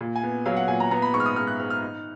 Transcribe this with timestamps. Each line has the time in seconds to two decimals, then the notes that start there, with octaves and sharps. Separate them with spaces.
0.01 A#2
0.16 G#5
0.23 B3
0.46 F#3 F5
0.57 F#5
0.68 A#2 G#5
0.80 A#5
0.91 B3 A#5
1.02 B5
1.13 G#2 C#6
1.20 F6
1.26 D#6
1.36 G#2 F6
1.47 F#6
1.60 G#2 F6
1.70 F6
1.82 D#4